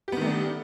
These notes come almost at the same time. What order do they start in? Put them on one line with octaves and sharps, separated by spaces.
G4 B3 D#3 A3 D4